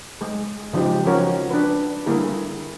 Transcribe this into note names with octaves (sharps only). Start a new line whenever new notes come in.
G#3 G#4
C#3 F3 G#3 D#4 G4
F3 C#4 F#4 A#4 C#5
D4 B4
D3 G3 A#3 E4 G#4